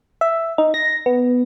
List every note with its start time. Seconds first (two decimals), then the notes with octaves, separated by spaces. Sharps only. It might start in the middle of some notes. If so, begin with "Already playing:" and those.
0.21 E5
0.58 D#4
0.74 A#6
1.06 B3